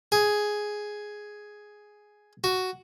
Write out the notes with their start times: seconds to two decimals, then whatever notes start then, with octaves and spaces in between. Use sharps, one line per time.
0.12 G#4
2.44 F#4